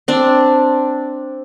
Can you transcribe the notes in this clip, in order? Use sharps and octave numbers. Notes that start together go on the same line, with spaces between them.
C4 D4